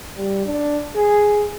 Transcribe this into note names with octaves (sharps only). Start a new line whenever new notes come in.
G3
D4
G#4